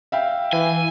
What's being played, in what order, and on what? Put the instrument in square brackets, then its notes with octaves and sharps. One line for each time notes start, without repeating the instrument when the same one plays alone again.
[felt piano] E5 F5 G5
[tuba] E3 [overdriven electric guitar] G#5